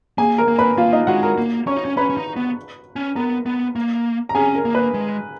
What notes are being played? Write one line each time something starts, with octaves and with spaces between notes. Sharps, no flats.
A#3 G#4 G#5
A#4 A#5
A#3
B4 B5
A#3 F4 F5
D#4 D#5
G#3 F#4 F#5
A#4 A#5
A#3
C#4 C#5 C#6
D#4
C#4
C#4 B4 B5
C#4
D#4
B3
C#4
B3 A#4 A#5
B3
A#3
A#5
C#4 G#4 G#5
A#4
A#3
B4
G#3